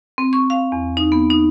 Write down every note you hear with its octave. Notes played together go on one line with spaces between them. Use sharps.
C4
C#6
F5
E2
D#4
B3
D#4